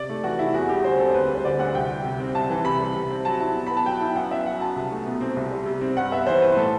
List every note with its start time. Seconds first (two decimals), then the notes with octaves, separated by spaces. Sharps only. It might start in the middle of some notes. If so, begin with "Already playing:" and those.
Already playing: C3 D5
0.09 A3
0.23 E3 F#4
0.39 C3 E4
0.54 E2 F#4
0.69 G3 G4
0.84 D3 C5
0.99 C4 A4
1.08 C5
1.14 D2 B4
1.29 G3
1.35 C5
1.44 D3 D5
1.59 D2 F#5
1.75 C2 G5
1.90 G3
2.05 C3
2.20 C4
2.35 C2 A5
2.50 E3
2.65 C3 B5
2.80 G3
2.95 C3
3.10 C4
3.25 F#3 A5
3.40 E4
3.55 B2
3.67 B3 B5
3.77 A5
3.85 F#3 G5
4.01 E4
4.15 F#2 F#5
4.31 B3 E5
4.46 F#3 F#5
4.61 F#2 A5
4.76 C2
4.91 A3
5.06 B2
5.21 C4
5.36 C2
5.51 G3
5.66 C3
5.81 C4
5.97 G2 F#5
6.12 B3 E5
6.27 E3 C5
6.42 E4 B4
6.57 A2 A4